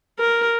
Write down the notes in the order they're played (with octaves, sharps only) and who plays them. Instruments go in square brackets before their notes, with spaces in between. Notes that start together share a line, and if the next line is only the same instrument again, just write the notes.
[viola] A#4